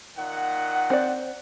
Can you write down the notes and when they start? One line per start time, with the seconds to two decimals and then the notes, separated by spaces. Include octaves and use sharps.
0.17 A#2 D#3 F#5
0.90 C4 C5 D5